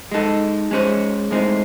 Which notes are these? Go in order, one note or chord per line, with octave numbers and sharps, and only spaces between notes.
G#3 D#4 A4
G#3 C#4 G#4 C5
A2 G#3 C4 D#4